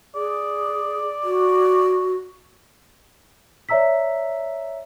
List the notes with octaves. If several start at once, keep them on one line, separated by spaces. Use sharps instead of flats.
G#4 D5
F#4
C#5 D5 E5 A#5 E6 B6